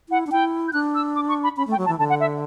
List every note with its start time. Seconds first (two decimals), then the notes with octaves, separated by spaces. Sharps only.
0.09 E4 F#5
0.27 D4
0.31 E4 G5
0.68 G6
0.73 D4 F#6
0.95 E6
1.15 D6
1.29 C#6
1.43 B5
1.57 C#4 B5
1.67 A3
1.72 G5
1.78 F#3
1.86 A5
1.89 E3
1.99 D3 A5
2.09 F#5
2.20 E5